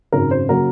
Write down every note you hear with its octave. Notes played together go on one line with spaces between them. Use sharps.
G#1 F#2 C#3 A#4
C5
C#3 F#3 A#3 A#4